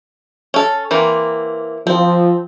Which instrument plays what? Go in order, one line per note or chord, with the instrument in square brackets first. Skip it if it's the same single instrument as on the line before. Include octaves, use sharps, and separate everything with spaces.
[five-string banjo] C#4 A4
E3 A#3 C4
[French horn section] F3 [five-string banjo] C4